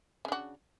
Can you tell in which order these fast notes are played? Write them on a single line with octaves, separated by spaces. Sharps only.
C#3 D4 F#4